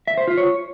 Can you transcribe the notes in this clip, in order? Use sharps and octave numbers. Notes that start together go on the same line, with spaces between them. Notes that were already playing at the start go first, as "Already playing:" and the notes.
E5
C5
F4
C#5